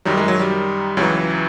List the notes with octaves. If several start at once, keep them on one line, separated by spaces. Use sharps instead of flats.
F#2 D#3 F#3 G3
G#3
F#3
G3
C#2 C#3 E3 F#3